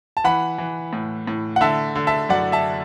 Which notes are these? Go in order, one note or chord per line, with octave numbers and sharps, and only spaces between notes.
A5
E3 F#5 B5
E3
A2
A2
F#5
D3 E5 A5
D3
E5 A5
F#2 D5 F#5
E5 A5